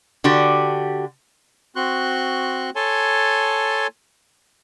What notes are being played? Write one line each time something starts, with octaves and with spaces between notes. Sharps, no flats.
D3 F#4 G4
C4 F#4 C6 C#6 F#6
A4 C#5 G#5 A5 C6